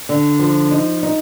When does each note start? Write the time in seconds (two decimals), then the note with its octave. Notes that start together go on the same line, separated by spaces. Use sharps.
0.09 D3
0.39 F3
0.71 D#4
1.03 D#4